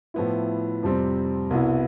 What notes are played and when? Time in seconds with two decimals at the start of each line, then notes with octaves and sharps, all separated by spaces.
0.14 A2 F3 B3 E4
0.83 F2 C3 G3 C4
1.50 C2 B2 B3 E4